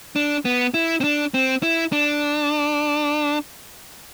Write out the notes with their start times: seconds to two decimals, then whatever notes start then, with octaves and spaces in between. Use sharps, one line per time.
0.16 D4
0.45 B3
0.74 E4
1.01 C4
1.04 D4
1.34 C4
1.63 E4
1.93 D4